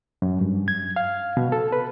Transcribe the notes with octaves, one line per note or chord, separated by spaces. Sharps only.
F#2
G2
G#6
F5
B2
A4
B4